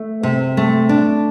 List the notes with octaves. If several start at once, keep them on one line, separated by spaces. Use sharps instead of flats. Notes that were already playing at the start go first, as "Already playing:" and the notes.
Already playing: A3
C3
A3
D4